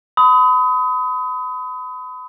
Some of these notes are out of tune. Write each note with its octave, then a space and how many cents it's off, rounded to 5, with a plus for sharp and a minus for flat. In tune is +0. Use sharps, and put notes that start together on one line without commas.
B5 +35 D#6 +25